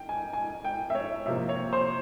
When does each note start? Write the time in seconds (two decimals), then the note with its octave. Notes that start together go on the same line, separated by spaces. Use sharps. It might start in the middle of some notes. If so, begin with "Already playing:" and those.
Already playing: G5
0.09 G#5
0.33 G#5
0.65 G5
0.90 E5
0.95 C#5
1.26 C3 F3 A#3 E5
1.49 C#5
1.73 C5